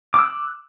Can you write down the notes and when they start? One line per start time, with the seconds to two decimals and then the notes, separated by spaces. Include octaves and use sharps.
0.14 D6
0.19 E6
0.23 F#6